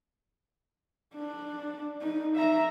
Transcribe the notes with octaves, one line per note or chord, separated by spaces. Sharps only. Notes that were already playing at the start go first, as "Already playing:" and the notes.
D4
D#4
E5 A#5